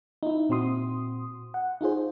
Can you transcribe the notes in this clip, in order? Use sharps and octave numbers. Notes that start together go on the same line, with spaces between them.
D#4 E4
A#2 C4 F#4 C6 D#6
F#5
D#4 F4 G#4 C5